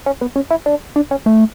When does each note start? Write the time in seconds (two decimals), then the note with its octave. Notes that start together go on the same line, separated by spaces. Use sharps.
0.06 C#4
0.21 B3
0.36 C#4
0.51 E4
0.66 D4
0.96 D4
1.11 C#4
1.26 A3